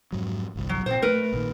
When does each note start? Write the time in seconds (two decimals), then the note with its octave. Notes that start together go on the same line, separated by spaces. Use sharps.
0.12 F2 G#2 F#3
0.56 G1 C2
0.69 F#3
0.86 A#2 C4 C5
1.02 A3 A#3 A#4 B4
1.32 A#1 A#2 D#3